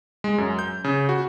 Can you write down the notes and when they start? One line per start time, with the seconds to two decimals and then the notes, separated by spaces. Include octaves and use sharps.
0.24 G#3
0.38 F#2
0.59 G6
0.84 C#3
1.09 F#4